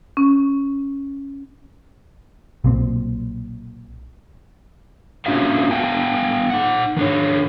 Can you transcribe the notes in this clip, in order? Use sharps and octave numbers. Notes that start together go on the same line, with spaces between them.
C#4
B1 A#2 C4
A#3 C#4 D4 F#4 E5 F5
B3 F5 G5 G#5
D#4 F#5
D#3 D4 C#5